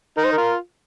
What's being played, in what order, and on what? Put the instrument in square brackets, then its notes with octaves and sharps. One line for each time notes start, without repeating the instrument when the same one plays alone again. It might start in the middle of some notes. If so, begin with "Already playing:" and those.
[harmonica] D#4 [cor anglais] A#4
[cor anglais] C5
A#4
[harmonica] F4